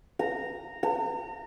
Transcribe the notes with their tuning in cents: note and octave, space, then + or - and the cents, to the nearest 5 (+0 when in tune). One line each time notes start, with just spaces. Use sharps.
A#5 -10
A#5 -35